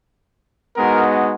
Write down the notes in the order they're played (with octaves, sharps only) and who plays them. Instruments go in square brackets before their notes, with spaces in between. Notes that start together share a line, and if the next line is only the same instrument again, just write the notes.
[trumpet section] G#3 B3 D#4 F#4 A#4